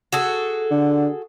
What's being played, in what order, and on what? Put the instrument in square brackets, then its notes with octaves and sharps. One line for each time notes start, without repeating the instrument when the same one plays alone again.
[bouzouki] F#4 G#4 A4
[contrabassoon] D3